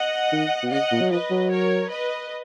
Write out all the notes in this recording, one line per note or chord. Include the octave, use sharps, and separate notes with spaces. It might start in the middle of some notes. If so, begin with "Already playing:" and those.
Already playing: D#5 F#5
D#3
B2
C#3 D#5 F#5
A#2
F#3
F3 B4 D#5
F#3
A#4 C#5
B4 D#5